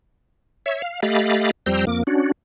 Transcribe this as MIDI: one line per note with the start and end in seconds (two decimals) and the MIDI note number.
0.66 0.82 73
0.66 0.82 76
0.82 1.00 77
1.03 1.51 57
1.03 1.51 67
1.03 1.51 75
1.03 1.51 77
1.03 1.51 83
1.03 1.51 93
1.66 1.85 41
1.66 1.85 55
1.66 1.85 72
1.66 1.85 79
1.66 1.85 82
1.66 1.85 88
1.87 2.03 41
1.87 2.03 58
1.87 2.03 86
2.07 2.32 61
2.07 2.32 62
2.07 2.32 66